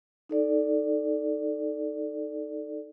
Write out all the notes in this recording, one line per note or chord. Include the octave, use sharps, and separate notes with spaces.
D#4 A4 D5